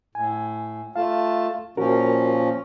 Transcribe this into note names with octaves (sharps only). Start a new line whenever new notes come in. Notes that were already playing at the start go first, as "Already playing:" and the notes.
A2 G#5
A3 F4 F5 A5
A#2 F3 C#4 F#4 A#4